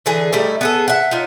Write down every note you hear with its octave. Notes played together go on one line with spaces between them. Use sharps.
D3 E3 G#4
G3 A3 D#4 E4
B3 G#4 A4
E5 F#5
D#4 F4 C#5